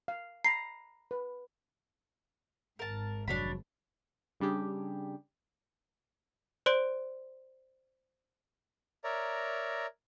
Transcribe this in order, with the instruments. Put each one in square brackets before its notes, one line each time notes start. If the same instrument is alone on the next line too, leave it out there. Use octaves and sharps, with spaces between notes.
[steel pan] F5
[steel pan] A#5 B5 [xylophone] C7
[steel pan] B4
[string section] G#1 G#2 [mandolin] A#4 A5
[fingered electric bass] F1 C3 F#3 [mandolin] D4 C#5 B5
[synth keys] C#3 G3 D4 G4 G#4
[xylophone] C5 D5 C6 D7
[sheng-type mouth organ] A#4 C#5 D5 E5 A#5